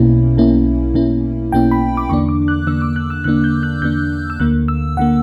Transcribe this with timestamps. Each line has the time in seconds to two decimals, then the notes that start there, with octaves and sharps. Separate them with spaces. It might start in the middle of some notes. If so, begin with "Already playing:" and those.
Already playing: B1 B2 A#3 C#4 E4
0.37 B1 B2 A#3 C#4 E4
0.94 B1 B2 A#3 C#4 E4
1.52 B1 B2 A#3 C#4 E4 G5
1.71 B5
1.97 D6
2.09 E2 D3 A#3 D4 C#6
2.29 D6
2.48 F#6
2.67 E2 D3 A#3 D4 E6
2.82 D6
2.96 F#6
3.10 E6
3.24 E2 D3 A#3 D4 F#6
3.44 G6
3.63 F#6
3.82 E2 D3 A#3 D4 G6
4.30 E6
4.39 D2 D3 A#3 F#6
4.68 E6
4.97 D2 D3 A#3 F#5